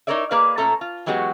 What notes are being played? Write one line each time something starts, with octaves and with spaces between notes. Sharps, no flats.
D#4 E4 A#4 C#5 D5 E5
A#3 G#4 B4 D5 F5
A#2 A3 C#4 A4 A#5
F4
E3 F#3 G#3 B3 F#4 G4